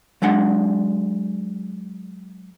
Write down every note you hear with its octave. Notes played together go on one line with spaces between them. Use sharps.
F#3 G#3 D4 F#5